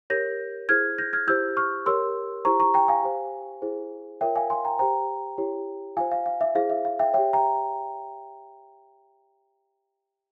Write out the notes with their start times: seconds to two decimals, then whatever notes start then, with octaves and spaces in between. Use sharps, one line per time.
0.10 G4 A#4 C#5 G6 A#6
0.69 E4 G#4 C5 F6 G#6
0.98 G6 A#6
1.13 F6 G#6
1.27 E4 G4 C5 E6 G6
1.57 C#6 F6
1.86 G4 A#4 C#5 C6 E6
2.45 E4 G4 C5 A#5 C#6
2.60 A#5 C#6
2.74 G5 A#5
2.88 F5 G#5
3.03 G4 C5
3.62 E4 G#4 C5
4.21 F4 A#4 C#5 E5 G5
4.36 F5 G#5
4.50 G#5 C6
4.65 G5 A#5
4.79 G4 C5 G5 A#5
5.38 E4 G4 C#5
5.97 F4 C5 F5 G#5
6.11 F5
6.26 F5
6.41 E5
6.55 E4 G#4 C5 F5
6.70 E5
6.85 F5
6.99 E5 G5
7.14 G4 C#5 E5 G5
7.33 G5 A#5